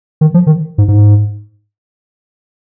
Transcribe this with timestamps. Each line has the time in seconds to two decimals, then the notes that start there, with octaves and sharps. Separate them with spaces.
0.21 D#3
0.34 F3
0.47 D#3
0.78 G#2
0.88 G#2